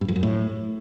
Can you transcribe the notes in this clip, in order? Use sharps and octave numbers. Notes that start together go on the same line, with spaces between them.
G2
F2
F#2
A2